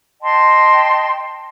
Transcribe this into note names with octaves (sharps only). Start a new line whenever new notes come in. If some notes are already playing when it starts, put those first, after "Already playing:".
D#5 G5 A5 C6